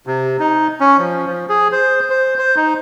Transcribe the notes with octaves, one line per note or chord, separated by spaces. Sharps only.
C3
D#4
C#4
F3
F3
G#4
C5
C5
C5
D#4